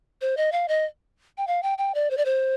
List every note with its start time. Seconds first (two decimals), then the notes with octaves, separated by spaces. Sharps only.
0.21 C5
0.37 D#5
0.52 F5
0.68 D#5
1.38 G5
1.47 F5
1.63 G5
1.78 G5
1.95 D5
2.10 C5
2.17 D5
2.25 C5